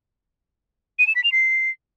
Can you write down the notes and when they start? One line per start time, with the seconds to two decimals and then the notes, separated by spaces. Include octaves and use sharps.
0.99 D#7
1.07 E7
1.15 B6
1.24 F7
1.32 C7